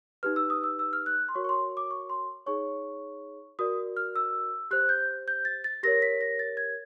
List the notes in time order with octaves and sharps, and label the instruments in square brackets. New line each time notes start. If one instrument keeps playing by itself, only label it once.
[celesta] D#4 G4 B4 F6
E6
D#6
E6
E6
F6
F#6
C6
F#4 A#4 C#5 C#6
C#6
C6
D6
C#6
C6
D#4 G#4 C#5 C#6
F#4 A#4 D5 D#6
F6
E6
G4 C5 F#6
G6
G6
A6
A6
G4 A#4 C#5 A#6
B6
A#6
A6
G#6